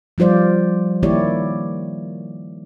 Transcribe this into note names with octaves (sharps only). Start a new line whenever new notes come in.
F3 G3 F4 C5 D5
D#3 A#3 E4 G4 C#5 D5